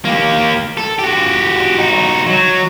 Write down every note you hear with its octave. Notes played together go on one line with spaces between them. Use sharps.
A#3 G4
A4
F#4 G4
D#4 F#4
F#3